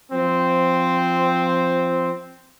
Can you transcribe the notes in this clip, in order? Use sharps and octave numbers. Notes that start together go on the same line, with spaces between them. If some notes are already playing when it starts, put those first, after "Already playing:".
F3 C4